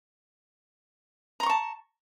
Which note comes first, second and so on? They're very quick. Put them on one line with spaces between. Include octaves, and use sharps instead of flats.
A#5 C6 C#6 A5